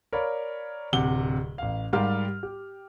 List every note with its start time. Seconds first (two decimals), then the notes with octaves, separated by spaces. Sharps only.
0.13 A#4 C#5 D5 F5 B5
0.93 D1 C3 F#5 G7
1.58 A1 F5
1.93 G#2 G3 G4 A#4 F5 F6
2.43 G4